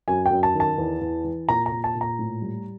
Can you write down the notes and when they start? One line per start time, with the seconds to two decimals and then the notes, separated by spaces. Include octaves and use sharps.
0.08 F#2 G#5
0.26 G5
0.31 F#2
0.43 A5
0.55 D#3
0.60 A5
0.78 E2
1.01 E2
1.24 E3
1.48 A#2 A#5
1.66 A#5
1.72 A#2
1.84 A5
1.95 A#2
2.01 A#5
2.19 A2
2.42 G3